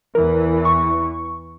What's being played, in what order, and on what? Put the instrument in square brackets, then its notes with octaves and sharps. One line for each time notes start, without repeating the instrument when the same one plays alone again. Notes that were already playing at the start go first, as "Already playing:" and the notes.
[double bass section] E2 E3 [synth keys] A#4
[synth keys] C#6